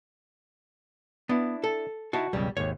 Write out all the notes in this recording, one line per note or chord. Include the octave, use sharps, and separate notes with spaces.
B3 D4 E4
A4
D#4 E4 F#4 A5
B1 F2 C#3 G3
G#1 D#2 C#5